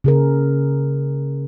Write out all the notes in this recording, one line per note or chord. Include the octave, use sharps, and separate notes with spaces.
C#3 G#4 A#4